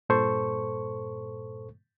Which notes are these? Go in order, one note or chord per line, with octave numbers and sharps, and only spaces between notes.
G2 A#2 A4 C5 C#6